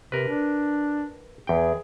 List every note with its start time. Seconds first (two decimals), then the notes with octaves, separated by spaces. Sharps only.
0.12 C3 A#4 B4
0.28 D4
1.47 E2 G#4 G5